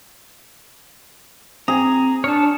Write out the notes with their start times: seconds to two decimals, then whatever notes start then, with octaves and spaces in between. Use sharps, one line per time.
1.68 C4 G#4 A#5
2.24 D4 C#5 A5 F6